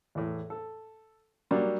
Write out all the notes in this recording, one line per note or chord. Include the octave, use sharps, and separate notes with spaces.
E2 A2
A4
F#3 G3 A#3 D4